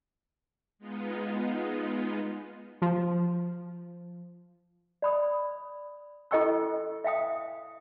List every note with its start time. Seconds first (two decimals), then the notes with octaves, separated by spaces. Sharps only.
0.79 G#3 B3 D#4 F4
2.82 F3
5.02 D5 B5 D#6
6.31 E4 A4 D#5 G5 C#6 E6
7.04 E5 F5 G5 D#6